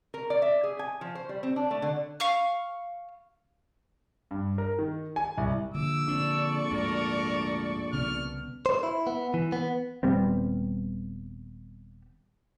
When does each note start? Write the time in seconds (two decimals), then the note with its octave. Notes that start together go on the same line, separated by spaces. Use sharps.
0.14 A#4
0.30 D5
0.42 E5
0.63 G#4
0.79 G#5
1.01 F3
1.15 C5
1.29 G3
1.43 C4
1.56 D4
1.71 A3
1.82 D3
2.20 F5 C#6 F6
4.31 G2
4.58 A#4
4.79 D#3
5.16 G#5
5.38 C2
5.74 A#1 D3 D6 E6
6.08 D3 C4 D4 A4 D5 C#6
6.71 D2 G#2 A#4
7.93 C2 C#3 B3 F6
8.66 C5
8.83 E4
9.07 B3
9.34 E3
9.52 B3
10.03 D#1 G3 B3 C4